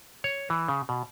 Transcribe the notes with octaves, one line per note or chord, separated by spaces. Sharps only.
C#5
E3
C#3
B2